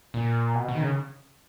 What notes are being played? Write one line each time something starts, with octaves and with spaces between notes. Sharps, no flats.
A#2
B2
B2
D#3
C#3